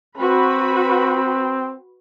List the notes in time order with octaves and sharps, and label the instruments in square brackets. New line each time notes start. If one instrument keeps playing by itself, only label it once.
[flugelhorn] C4 [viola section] F#4 B4 B5